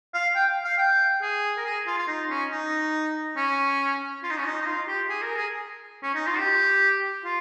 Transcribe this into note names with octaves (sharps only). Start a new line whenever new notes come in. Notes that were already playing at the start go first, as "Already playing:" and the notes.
F5
G5
F5
G5
G#4
A#4
G#4
F4
F4
D#4
C#4
D#4
C#4
F4
D#4
C#4
D#4
D#4
F4
G4
G#4
A#4
G#4
C#4
D#4
F4
G4
F4